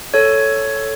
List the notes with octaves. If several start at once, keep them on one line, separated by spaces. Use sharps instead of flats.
A4 C#5